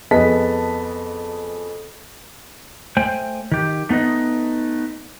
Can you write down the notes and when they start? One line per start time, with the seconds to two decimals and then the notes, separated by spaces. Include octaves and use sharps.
0.11 F2 B3 G#4 D#5 A5 B6
2.97 A3 C5 G5 G#5
3.52 D#3 G4
3.89 A3 B3 D#4 B4 D#5